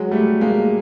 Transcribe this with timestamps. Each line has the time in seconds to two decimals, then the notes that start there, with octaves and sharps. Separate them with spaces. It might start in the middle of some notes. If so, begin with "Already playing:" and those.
Already playing: F#3 G#3
0.11 G3 A3
0.41 G#3 A#3